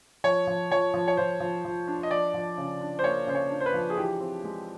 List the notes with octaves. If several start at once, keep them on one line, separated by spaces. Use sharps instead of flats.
F3 C#5
F3
F3 C#5
F3
C#5
F3 C5
F3
F3
D4
D#5
F3 D5
F3
C#3
D4
C5
A#3 C#5
C#3 C5
C#5
D4
C5
B4
F3
G#4
E3 G4
C4
G#3